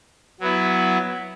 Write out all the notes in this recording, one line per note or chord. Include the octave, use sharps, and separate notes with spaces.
F#3 B3 E4